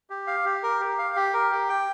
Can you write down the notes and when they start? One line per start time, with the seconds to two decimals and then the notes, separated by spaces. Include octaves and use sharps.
0.10 G4
0.27 F5
0.45 G4
0.63 A#4
0.81 G4
0.98 F5
1.16 G4
1.33 A#4
1.51 G4
1.69 G5